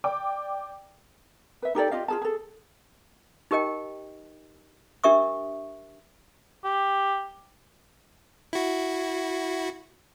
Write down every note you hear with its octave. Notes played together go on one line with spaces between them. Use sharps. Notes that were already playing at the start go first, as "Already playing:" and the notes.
D5 G5 D6
B4 E5
D#4 G4 A4 D5
F4 G4 D#5 F5
F4 G#4 A5
G#4 A4
D#4 G4 A#4 D#5 G5
D4 G4 A#4 E5 C#6 D#6
G4
E4 F#4